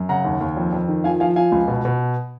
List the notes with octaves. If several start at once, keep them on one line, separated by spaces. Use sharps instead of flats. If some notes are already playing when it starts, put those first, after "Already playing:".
Already playing: F#2
C#3 F#5 A#5
D#2
D#2
F2
F2
D#3
F3 F5 G#5
F3 F5 G#5
F3 F5 G#5
C#2
B2
B2